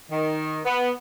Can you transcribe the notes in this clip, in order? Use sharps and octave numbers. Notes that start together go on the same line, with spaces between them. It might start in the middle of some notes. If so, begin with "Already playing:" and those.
D#3
B3